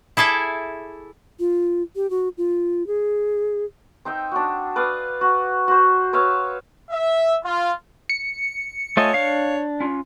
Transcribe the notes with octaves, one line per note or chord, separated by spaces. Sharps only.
E4 G#4 A4 D5 E5
F4
G4
F#4
F4
G#4
C4 D#4 E5 G5
D4 F#4
B4 D5 F5 D#6
F#4
F#4 C5
B4 C#5 E5 F5
E5
F4
C#7
A3 F4 C#5 D#5 G#5 A5
D4 F5
C#4 F4